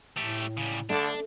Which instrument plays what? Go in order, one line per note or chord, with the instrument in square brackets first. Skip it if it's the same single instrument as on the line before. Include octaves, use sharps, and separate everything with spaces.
[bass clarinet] A2 [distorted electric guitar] A3 G4
[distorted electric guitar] C#3 G3
[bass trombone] D3 [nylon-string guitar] A3 [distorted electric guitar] D4